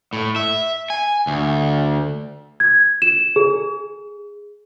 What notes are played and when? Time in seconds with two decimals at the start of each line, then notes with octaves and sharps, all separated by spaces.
0.13 A2
0.36 E5
0.90 G#5
1.27 D2
2.60 G#6
3.02 E7
3.36 G#4